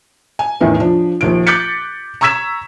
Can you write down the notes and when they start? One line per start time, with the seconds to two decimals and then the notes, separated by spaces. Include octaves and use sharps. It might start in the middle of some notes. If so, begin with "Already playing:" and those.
0.39 G#5
0.61 E2 A2 D#3 E3 B3
0.80 F3 D4
1.21 A#1 D#2 D7
1.47 D6 F#6 G6 A6 B6 C#7
2.21 A#5 C#6 E6 G#6 B6 E7